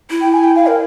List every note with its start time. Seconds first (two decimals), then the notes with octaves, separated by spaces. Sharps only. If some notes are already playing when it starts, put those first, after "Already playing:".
0.10 E4
0.21 G5
0.33 G#5
0.44 G5
0.56 F5
0.67 A#4